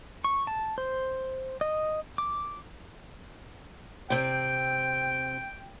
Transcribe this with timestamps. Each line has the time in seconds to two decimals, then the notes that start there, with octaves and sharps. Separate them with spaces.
0.24 C#6
0.47 A5
0.78 C5
1.61 D#5
2.18 D6
4.10 C3 C4 G5